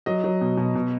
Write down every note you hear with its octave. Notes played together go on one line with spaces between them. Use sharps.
F#3 D#5
F#3
B2
B2
B2